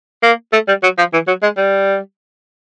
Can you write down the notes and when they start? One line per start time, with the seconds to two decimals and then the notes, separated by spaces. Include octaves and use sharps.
0.23 A#3
0.53 A3
0.68 G3
0.83 F#3
0.98 F3
1.13 E3
1.28 F#3
1.43 G#3
1.57 G3